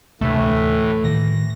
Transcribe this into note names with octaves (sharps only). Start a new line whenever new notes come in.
D2 A2 C3 E3 A3 D4
A2 D#3 A#6